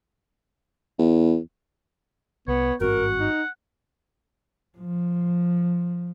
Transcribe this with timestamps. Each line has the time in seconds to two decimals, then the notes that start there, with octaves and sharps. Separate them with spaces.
0.99 E2
2.48 C2 B3 C#5
2.81 G#1 G2 C4 F#4 A#4 F#5
3.20 D#4
4.78 F3